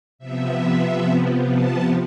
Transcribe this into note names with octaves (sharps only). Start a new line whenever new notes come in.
C3 F3 B3 E5
A5